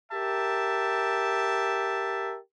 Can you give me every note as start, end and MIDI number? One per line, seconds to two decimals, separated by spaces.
0.12 2.38 67
0.12 2.38 70
0.12 2.38 76
0.12 2.38 81